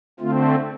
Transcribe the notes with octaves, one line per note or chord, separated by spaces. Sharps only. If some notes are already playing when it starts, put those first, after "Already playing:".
D3 A3 C4 F4